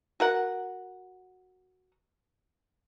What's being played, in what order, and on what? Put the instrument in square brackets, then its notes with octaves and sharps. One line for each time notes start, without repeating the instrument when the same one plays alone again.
[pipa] F#4 A#4 F#5